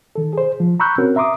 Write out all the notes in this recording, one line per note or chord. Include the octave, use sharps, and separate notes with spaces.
D#3 A4
G#4 C5
F3
A#5 B5 C#6 E6 F#6 G6
C4 C#4 F#4 A#4
E5 A#5 C6 D6 D#6